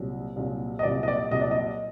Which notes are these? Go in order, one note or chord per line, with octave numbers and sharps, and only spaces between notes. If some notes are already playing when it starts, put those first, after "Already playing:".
Already playing: C2 A#2 F#3
C2 A#2 F#3
D#5
C2 A#2 F#3 D5
D#5
D5
C2 A#2 F#3 D#5
D5
D#5